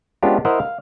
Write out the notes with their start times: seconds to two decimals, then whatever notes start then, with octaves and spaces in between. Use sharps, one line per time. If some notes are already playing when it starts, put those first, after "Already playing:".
0.23 G#3 B3 C#4 D4 F4 G4
0.45 E4 A#4 C5 D#5 E5 F#5
0.60 F5